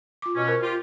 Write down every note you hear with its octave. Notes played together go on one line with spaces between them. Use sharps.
F4 D6
B2 C#4
A#4 C5
F4 G4